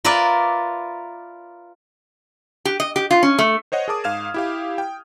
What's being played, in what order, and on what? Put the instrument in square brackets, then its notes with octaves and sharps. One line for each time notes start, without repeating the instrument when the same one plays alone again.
[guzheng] F4 A#4 B4 D5 E5
[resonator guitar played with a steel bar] G4
D#5
G4
F4
C#4
A3
[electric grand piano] C5 C#5 D#5 F#5
G#4 A#4 A5 D6 D#6
G#2 F5 F6 G#6 E7
E4 G4 F5
G5